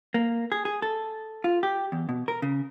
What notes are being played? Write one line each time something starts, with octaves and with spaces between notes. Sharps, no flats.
A#3
G#4
G#4
A4
F4
G4
E2
B2
A#4
C#3